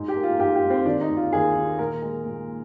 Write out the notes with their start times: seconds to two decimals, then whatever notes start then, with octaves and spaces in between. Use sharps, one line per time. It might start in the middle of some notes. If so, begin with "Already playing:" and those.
Already playing: G#2
0.08 G4
0.15 A#3
0.23 F4
0.39 G#2 G4
0.55 G4
0.63 G#2
0.70 C4
0.86 D#3 D4
1.01 D#4
1.09 D#2
1.17 F4
1.33 D#2 G#4
1.55 D#3
1.79 A#2 A#4
2.02 G#3
2.25 A#2